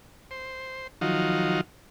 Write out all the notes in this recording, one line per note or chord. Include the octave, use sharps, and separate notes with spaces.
C5
D#3 F3 F#3 D#4 F4 F#4